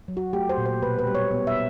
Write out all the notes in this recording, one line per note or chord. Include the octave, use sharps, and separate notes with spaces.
F#3
F#4
A3 G4
C5
A#2
C5
B2 B4
B4
G3
C#5
B3
E5